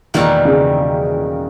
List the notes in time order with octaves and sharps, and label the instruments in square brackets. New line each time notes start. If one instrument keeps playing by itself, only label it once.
[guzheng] E2 B2 G3 A#3 [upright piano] D#3
[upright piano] C#3